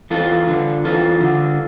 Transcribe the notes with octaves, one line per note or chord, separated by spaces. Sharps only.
E2 F4 A4
D3
E2 F4 A4
D3